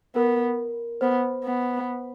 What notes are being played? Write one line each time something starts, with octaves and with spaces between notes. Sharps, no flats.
B3 A#4
B3 C5
B3